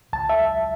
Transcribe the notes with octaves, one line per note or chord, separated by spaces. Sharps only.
C#2 A5
E5